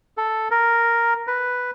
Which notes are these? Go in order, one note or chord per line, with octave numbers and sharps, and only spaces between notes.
A4
A#4
B4